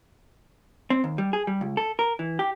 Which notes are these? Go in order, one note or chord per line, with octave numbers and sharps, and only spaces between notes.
C4
D#2
G3
G#4
G3
C#2
A4
A#4
E3
G4